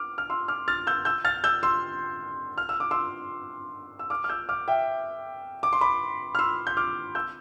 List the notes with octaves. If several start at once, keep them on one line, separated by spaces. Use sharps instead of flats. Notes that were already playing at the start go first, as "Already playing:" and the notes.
Already playing: D6 F6
F6
C6 E6
D6 F6
F6 A6
E6 G6
E6 G6
F6 A6
E6 G6
C6 E6
F6
E6
D6
C6 E6
E6
D6 F6
F6
E6 G6
D6 F6
E5 G5
D6
C6
B5 D6
F6
C6 E6
G6
D6 F6
E6 G6